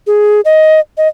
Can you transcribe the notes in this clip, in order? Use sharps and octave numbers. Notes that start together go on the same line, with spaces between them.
G#4
D#5
D#5